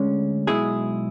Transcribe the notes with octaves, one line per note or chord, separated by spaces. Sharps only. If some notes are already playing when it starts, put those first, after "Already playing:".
Already playing: D2 D3 G#3 C#4
B1 B2 G#3 E4 G#4